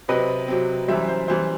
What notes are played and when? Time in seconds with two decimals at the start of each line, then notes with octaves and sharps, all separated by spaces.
0.08 C3 F#3 C4 B4 D#5
0.48 C3 F#3 C4
0.88 F#2 E3 G3 C5 E5
1.08 C5
1.28 F#2 E3 G3 C5